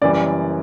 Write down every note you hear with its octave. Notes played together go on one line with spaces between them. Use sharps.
F#1 F#2 E3 G3 D5